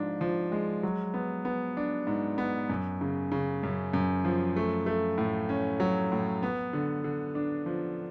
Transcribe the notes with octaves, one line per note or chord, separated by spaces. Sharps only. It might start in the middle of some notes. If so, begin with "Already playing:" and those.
Already playing: G#2 F3 D4
F3
G#3
F#3
B3
B3
D4
G#2
B3
F#2
C#3
C#3
F#2
F#2
F3
A3
A3
A2
C#4
F#3
A2
B3
D3
D3
D4
F3